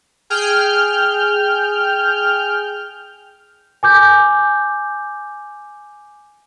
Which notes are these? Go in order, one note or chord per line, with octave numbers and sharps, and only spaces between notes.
G#4 G5 F6 G6
G#5 D6 G6